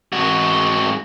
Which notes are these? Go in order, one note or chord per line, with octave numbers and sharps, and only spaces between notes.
G#2 F#4